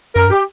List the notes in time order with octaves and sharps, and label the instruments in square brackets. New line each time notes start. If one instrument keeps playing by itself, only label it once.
[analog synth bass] F#2 [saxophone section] A#4
[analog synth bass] G2
[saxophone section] G4